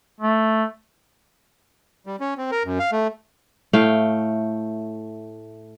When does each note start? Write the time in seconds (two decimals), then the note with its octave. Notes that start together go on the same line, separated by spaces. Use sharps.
0.21 A3
2.06 G3
2.20 C#4
2.38 C4
2.52 A#4
2.64 F#2
2.79 F5
2.92 A3
3.73 A2 A3 F5 G5